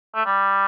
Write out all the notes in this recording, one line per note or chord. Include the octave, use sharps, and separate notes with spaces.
A3
G3